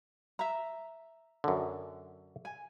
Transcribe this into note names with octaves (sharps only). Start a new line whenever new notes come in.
E5 A#5
F#2 D3
G#5